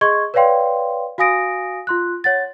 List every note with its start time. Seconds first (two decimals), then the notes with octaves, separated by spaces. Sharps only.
0.01 G#4 D#5 C6 C#6 G#6
0.34 B4 C#5 D5 F5 G5 C6
1.18 F#4 F5 G#5 D#6 A#6 D7
1.87 F4 C6 F#6
2.24 C#5 F#5 A6